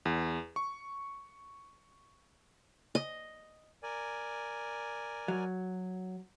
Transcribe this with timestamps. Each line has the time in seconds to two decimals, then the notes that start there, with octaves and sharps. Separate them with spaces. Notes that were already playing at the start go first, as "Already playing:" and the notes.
0.05 E2
0.56 C#6
2.95 D#5
3.83 A#4 D5 G#5
5.28 F#3